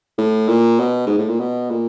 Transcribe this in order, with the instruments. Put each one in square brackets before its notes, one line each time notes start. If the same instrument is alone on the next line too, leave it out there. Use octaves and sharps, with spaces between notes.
[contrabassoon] A2
A#2
B2
G#2
A2
A#2
B2
A#2